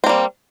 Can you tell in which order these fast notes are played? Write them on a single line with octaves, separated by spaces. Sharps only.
C4 A#3 G3